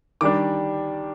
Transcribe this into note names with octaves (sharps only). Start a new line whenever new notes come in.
D#3 G3 D4 D6